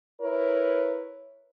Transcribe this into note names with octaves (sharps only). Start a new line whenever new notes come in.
E4 A#4 B4 C#5